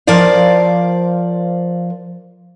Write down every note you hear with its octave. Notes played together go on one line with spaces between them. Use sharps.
F3 A#4 C5 D5 F5